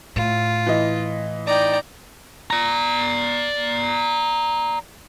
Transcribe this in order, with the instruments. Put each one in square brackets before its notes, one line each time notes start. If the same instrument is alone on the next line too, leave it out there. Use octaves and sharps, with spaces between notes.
[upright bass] A2 [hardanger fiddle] F4
[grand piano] E3 D#5
[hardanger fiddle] D#4 A#5 [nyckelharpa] D5 G5
[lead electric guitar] D5 A#5